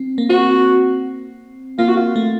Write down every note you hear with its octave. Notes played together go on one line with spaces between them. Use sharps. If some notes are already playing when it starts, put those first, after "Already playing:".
Already playing: C4
A#3
C4 F#4
A#3 F4
F#4
F4
A3